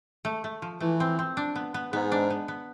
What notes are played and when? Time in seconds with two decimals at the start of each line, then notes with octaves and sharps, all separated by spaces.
0.25 A3
0.44 A3
0.62 F3
0.80 E3 A3
1.00 C4
1.19 C4
1.37 D4
1.56 B3
1.74 B3
1.93 G#2 B3
2.12 D4
2.30 B3
2.48 B3